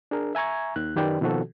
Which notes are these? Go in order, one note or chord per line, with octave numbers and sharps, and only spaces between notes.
D4 G#4 A#4
E5 G#5 A#5 C#6 G#6
D#2 D#3 F#6
F#2 D#3 G4 B4 D5 G5
B2 D#3 F3 C4 F#4 A4